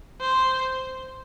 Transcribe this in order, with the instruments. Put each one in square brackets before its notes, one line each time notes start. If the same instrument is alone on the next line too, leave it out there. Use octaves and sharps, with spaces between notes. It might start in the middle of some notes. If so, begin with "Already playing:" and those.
[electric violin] C5